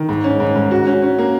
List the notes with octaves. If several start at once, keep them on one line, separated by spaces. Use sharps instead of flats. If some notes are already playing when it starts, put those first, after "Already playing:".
Already playing: D#3
G#2
C#4
G#2
G#2
F#4
C#4
C#4
A#3